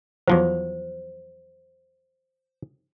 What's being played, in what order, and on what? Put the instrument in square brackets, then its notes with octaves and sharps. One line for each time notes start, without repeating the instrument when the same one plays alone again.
[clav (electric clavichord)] E2 F3 F#3 [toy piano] C5